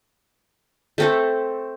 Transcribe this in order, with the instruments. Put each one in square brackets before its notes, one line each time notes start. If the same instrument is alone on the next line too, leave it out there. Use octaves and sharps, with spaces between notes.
[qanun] A3 C4 A4